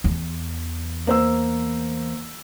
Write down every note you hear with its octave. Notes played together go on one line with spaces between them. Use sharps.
E2
A#3 C5 E6